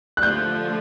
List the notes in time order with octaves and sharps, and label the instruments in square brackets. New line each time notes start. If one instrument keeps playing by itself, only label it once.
[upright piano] F#6
[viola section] D3 F3 A3 [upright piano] G6